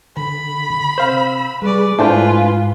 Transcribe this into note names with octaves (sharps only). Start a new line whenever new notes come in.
D3 B5
C3 C5 F5 E6
G3 G#4 B4 D5 C#6
G#2 A3 D4 E4 F4 B4 C5 G#5